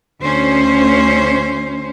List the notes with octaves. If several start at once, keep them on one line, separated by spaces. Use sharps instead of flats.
D2 C#4 C5